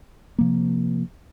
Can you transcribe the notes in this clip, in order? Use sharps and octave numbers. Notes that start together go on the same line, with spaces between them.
C3 F3 A#3